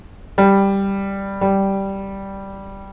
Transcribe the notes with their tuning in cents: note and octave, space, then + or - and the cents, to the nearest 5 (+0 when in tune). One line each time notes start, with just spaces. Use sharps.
G3 +5
G3 -5